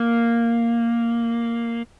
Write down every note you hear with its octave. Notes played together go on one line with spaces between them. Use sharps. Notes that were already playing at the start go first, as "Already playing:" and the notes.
Already playing: A#3